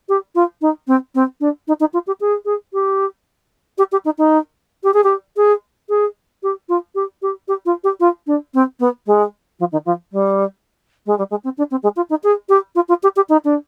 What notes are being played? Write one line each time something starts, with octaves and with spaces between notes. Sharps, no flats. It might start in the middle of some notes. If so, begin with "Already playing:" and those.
G4
F4
D#4
C4
C4
D4
D#4
D#4
F4
G4
G#4
G#4
G4
G4
G4
D#4
D#4
G4
G#4
G4
G#4
G#4
G4
F4
G4
G4
G4
F4
G4
F4
D4
C4
B3
G#3
F3
D#3
F3
G3
G#3
G3
G#3
C4
D4
C4
G#3
F4
D#4
G#4
G4
F4
F4
G4
G4
D#4
D4